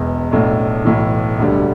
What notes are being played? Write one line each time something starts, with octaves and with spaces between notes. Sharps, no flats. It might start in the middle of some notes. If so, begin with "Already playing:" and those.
Already playing: E1 E2 B2
B1 A2 A3 D4
B1 A2 E3
E1 D2 D3 G3